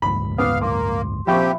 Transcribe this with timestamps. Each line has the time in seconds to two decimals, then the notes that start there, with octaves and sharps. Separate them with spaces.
0.02 F#1 D2 G#2 B5
0.38 B3 F5 D6 D#6 F6
0.61 A#3 C6 D6
1.27 A#1 C3 G4 E5 G5 B5 C#6